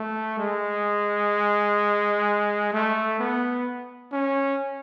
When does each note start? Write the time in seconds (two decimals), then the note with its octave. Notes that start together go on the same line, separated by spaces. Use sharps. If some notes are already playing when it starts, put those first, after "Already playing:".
Already playing: A3
0.39 G#3
2.73 A3
3.19 B3
4.12 C#4